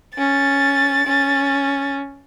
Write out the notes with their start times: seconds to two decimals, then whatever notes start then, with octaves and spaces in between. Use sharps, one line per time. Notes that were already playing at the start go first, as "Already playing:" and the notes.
0.18 C#4 A6
1.07 C#4